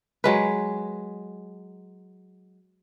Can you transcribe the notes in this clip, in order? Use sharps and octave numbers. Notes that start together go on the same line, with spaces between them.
F#3 G#3 B4